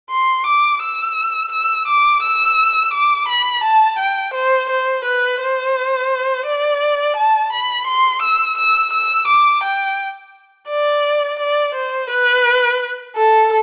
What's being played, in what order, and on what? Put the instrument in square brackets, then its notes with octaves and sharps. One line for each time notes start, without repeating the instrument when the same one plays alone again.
[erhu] C6
D6
E6
E6
D6
E6
D6
B5
A5
G5
C5
C5
B4
C5
D5
A5
B5
C6
E6
E6
E6
D6
G5
D5
D5
C5
B4
A4